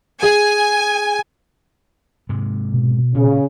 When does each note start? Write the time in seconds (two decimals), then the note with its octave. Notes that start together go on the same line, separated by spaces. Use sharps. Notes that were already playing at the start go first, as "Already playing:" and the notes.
0.23 G#4 G#5
2.29 G#2 C3 G#3
2.74 B2
3.15 A#2 C#3 C#4